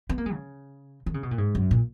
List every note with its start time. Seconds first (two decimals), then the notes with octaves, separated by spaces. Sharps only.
0.09 B3
0.18 A#3
0.26 G#3
0.33 C#3
1.06 D#3
1.14 C#3
1.23 B2
1.31 A#2
1.38 G#2
1.55 F#2
1.71 A#2